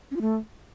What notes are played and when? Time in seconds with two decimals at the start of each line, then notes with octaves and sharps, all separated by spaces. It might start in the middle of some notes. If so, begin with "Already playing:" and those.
0.11 C#4
0.16 F4
0.21 A3